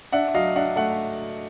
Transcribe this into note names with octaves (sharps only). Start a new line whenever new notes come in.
D4 E5 F#5
E5
F#3 D#5 F5
D4 E5 F#5
A3 E5 F#5